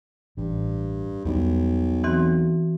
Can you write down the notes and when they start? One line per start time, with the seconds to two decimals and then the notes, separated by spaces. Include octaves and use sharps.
0.37 A1 G2
1.25 B1 E2 G3
2.04 E3 C4 F#4